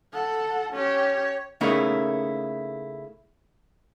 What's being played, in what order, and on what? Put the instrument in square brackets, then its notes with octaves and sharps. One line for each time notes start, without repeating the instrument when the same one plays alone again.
[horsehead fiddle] A4 F#5
[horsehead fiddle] C#4 G4 [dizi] C#5
[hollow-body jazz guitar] C#3 A3 A#3 D#4 E4